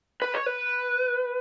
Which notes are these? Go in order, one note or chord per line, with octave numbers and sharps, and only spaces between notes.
B4
C#5
B4